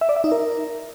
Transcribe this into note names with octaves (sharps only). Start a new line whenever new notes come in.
E5
D5
E5
D#4
A#4